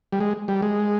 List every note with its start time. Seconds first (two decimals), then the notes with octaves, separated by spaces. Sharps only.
0.12 G3
0.20 G#3
0.48 G3
0.62 G#3